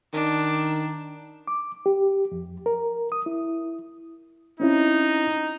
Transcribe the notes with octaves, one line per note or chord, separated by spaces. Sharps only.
D#3 D4
D6
G4
F2
A#4
D#6
E4
C4 C#4 D#4 E4